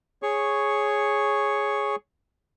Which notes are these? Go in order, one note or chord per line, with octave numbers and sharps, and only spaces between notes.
G#4 C#5 C#6